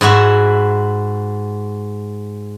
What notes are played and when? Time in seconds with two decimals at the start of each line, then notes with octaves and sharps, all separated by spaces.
0.01 G#2 E4 F#4 E5